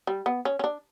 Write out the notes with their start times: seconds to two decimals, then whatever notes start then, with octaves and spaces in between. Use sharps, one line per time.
0.07 G3
0.26 B3
0.45 C#4
0.59 C#4
0.64 D4